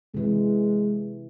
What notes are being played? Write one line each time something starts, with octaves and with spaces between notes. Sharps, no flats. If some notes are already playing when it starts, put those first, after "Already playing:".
C3 E3 G#3